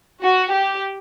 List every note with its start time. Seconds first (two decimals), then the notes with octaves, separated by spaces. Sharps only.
0.23 F#4
0.52 G4